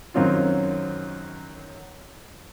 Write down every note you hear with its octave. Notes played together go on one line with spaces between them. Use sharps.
F#2 D#3 F#3 C4 F4